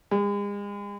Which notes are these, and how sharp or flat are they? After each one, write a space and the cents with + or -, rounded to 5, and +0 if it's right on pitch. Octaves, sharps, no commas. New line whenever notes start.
G#3 -40